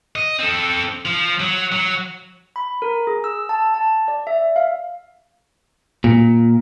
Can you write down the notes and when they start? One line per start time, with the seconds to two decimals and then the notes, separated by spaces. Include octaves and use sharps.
0.16 D#5
0.39 C4 A4
1.05 F3
1.40 F#3
1.72 F#3
2.56 B5
2.82 A#4
3.07 G#4
3.24 E6
3.49 A5
3.74 A5
4.08 D5
4.27 E5
4.56 F5
6.04 A#2